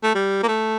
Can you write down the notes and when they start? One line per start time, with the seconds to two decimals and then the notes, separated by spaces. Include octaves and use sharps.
0.03 A3
0.15 G3
0.43 A#3
0.48 A3